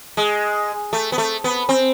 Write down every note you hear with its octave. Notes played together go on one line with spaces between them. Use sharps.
G#3
A3
B3
A3
B3
C4